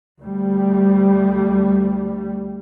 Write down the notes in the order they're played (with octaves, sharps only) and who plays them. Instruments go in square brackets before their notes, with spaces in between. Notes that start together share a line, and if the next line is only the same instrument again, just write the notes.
[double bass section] D2 G3